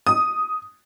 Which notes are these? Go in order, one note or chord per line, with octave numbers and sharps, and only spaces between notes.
D#6